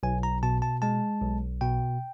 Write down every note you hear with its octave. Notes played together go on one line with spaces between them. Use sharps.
B1 G#5
A#5
B2 A5
A5
G#3 A5
B1
B2 G5